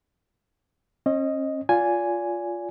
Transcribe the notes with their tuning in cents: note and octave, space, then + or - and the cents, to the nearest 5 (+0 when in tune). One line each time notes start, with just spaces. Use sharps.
C#4 -40 D#5 +0
F4 +0 D5 -30 G#5 +0